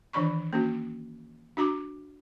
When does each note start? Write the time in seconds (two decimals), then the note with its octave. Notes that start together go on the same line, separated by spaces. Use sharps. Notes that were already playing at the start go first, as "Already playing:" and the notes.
0.13 D#3 E3 D4 D5 B5 C#6
0.53 A#3 C#4 F#4
1.57 D4 F#4 A#5 D6